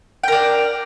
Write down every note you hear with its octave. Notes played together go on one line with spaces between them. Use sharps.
D4 A#4 G5